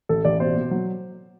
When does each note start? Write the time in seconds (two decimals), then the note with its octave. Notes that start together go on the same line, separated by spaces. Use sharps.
0.09 A1 A4
0.24 A1 D5
0.40 B2 C5
0.56 B2
0.71 F#3